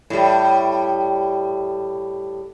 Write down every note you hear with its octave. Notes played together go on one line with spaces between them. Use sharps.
A2 G3